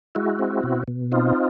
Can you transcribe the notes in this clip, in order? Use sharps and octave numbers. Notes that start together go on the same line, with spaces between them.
G#3 E4 F#4
C4
B2
B2
C4 D#4 F4